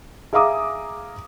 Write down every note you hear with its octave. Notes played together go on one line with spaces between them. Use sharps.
G#4 E5 F5 A#5 D6 D#6